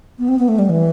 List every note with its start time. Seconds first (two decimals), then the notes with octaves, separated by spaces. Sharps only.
0.19 B3
0.28 C4
0.39 B3
0.48 A3
0.59 G3
0.69 E3